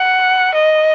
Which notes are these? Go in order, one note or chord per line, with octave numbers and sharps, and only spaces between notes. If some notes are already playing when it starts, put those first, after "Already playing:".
Already playing: F#5
D#5